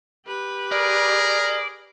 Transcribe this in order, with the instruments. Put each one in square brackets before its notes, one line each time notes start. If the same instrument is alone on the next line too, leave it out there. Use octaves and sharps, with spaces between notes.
[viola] G4 B4
[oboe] G#4 [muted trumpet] A#4 [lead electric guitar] D5